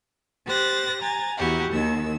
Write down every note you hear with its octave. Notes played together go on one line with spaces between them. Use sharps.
G4 C5 F#6 A6 A#6
G#5 A#5 A6
E2 E4 F#4 G4
D#2 D#3 E6